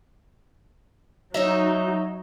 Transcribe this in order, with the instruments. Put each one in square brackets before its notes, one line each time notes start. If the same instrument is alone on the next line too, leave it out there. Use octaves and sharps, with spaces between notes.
[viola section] F#3 D#4 [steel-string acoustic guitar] C#5 D#5 E5